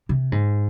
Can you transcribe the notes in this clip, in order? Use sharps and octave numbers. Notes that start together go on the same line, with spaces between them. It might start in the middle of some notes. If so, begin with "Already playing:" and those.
C3
G#2